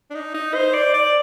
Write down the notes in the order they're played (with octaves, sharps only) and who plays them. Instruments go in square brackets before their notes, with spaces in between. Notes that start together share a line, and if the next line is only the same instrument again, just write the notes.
[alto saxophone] D4
D#4
D#4
C5
D5
D5